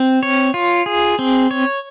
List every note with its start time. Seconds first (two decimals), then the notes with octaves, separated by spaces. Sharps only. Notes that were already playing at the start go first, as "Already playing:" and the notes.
Already playing: C4
0.23 C#5
0.54 F4
0.86 G#4
1.19 C4
1.51 C#5